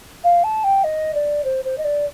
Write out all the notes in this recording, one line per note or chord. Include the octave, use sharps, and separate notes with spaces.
F5
A5
G5
D#5
D5
C5
C5
D#5
D5